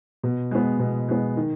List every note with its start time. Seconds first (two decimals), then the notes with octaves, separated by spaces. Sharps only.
0.23 B2
0.51 G#3 B3
0.79 B2
1.09 G#3 B3
1.37 D#3